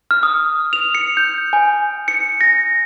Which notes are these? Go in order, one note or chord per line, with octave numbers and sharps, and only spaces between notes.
F6
D#6
F7
C#7
G6
G#5
C#7
A#6